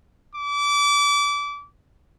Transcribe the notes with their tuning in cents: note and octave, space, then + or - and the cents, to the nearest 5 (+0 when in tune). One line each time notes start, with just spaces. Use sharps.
D6 -25